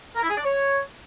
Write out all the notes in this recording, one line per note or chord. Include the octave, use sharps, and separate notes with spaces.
A#4
E4
G#4
D5
C#5